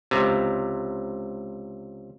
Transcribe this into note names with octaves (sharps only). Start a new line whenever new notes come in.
C#2 C3